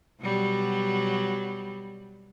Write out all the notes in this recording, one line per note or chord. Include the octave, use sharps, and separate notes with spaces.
B2 F#3 G3